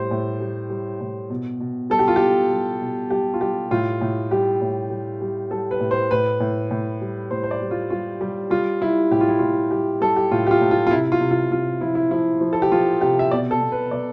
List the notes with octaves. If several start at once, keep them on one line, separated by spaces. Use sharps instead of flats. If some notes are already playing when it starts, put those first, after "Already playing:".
Already playing: A2 G3 C5
A2
G3
G3
A2
B2
B2
G3 A4
G4
F4
B2 G4
G3
B2
G3 G4
F4
G3 G4
A2 F4
A2
G3 G4
A2
G3
G3
G3 A4
B4
A2
C5
A2 B4
A2
A2
G3
A2 C5
C5
D5
G3
F4
G3 F4
G3
G3 F4
G3 E4
A2 G4
F4
E4
A2 F4
G3 G4
G3 A4
G4
A2 F4
G4
F4
A2
F4
F4
C3 E4
F4
C3
F4
C3 F4
F3 E4
E4
F3 E4
F3
A4
G4
F3 F4
C3 G4
E5
B2 D5
A4
B2
B4
B2 D5